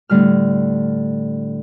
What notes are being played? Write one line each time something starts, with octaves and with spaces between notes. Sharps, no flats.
A2 D3 G3 F6